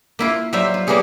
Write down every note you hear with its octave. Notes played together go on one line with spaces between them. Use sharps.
A#3 E4 F4
F#3 G3 F4 C5 E5
F4
F#3 G3 A#3 B3 G#4 C#5